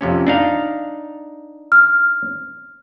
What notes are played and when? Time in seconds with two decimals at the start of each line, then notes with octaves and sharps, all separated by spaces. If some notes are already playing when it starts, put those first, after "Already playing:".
0.01 F2 C3 C#4
0.27 D4 D#4 F5
1.72 F6